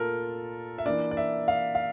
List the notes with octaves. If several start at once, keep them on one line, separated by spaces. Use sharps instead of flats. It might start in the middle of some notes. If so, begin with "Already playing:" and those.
Already playing: A#2 A3 F4 A4 A#4
E5
E3 A#3 D4 D5
D5
E5
F5
F5